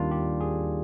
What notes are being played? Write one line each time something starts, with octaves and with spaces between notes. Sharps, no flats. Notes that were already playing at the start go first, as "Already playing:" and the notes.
Already playing: D#2 D#3 G3 D4 F4
G4
G#4